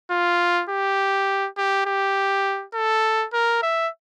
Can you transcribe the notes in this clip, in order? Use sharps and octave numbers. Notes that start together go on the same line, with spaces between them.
F4
G4
G4
G4
A4
A#4
E5